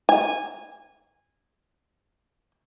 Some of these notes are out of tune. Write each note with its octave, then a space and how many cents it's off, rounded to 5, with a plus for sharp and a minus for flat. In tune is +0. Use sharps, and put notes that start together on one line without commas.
G#5 -15